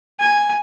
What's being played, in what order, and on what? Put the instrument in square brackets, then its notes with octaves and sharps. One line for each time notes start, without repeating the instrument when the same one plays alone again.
[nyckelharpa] G#5